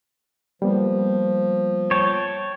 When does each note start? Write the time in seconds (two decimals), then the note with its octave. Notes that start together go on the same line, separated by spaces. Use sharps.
0.62 F3 G3 A#3 B3
1.91 C#5 G5 A5